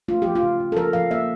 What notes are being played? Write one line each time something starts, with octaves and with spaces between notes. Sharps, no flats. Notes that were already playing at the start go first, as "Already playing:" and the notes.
A3 F4
F3 G4
F4
C#3
C#3
A4
F3 A#4
F3 F5
A#3 E5